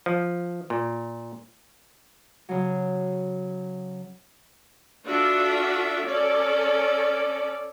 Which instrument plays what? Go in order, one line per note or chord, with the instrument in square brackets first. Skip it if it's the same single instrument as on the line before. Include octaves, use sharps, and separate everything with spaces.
[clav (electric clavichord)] F3
A#2
[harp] C#3 F#3
[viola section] D4 F4 F#4 A4 E5
C#4 A4 D5